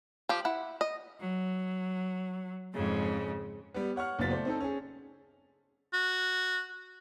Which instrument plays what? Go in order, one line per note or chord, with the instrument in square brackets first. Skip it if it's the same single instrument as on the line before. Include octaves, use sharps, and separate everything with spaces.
[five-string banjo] F3 G4
E4 F#5
D#5
[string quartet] F#3
F2 G#2 C#3
[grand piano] G3 B3
C#5 F#5 C#6 F6
F#1 A#2 F#3 B3 A6 B6
A3 C5 D5
C4 D#4 A4
C#4 G#4
[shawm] F#4